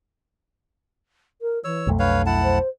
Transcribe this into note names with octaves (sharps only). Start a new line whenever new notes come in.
A#4
E3 C#5 E6
B1 F2 A3
D4 B4 C#5 F5
E4 F#5 A5
C5